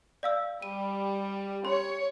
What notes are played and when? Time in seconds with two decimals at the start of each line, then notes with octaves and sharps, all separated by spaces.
0.23 D5 F5 E6
0.62 G3 D#7
1.65 C#5 C6